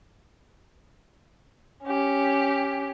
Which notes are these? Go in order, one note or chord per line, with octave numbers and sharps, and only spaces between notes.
C#4 G4